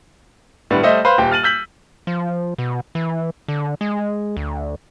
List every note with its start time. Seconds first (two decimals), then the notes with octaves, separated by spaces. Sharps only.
0.71 A2 D3 G3 B3
0.83 G3 A3 C5 D#5 E5
1.05 B4 C5 F5 C6
1.18 D#1 G4 G5
1.32 F6 A6 D#7 F#7
1.43 E6 G6 B6 F#7
2.07 F3
2.58 B2
2.95 E3
3.48 D3
3.81 G#3
4.37 D2